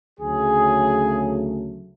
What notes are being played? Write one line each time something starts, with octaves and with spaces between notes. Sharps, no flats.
D2 C#3 F#3 A3 G#4